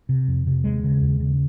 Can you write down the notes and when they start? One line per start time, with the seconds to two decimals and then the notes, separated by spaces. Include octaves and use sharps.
0.09 C3
0.28 F2
0.47 C3
0.64 D#2 G#3
0.84 C#3
1.02 D#2
1.20 C#3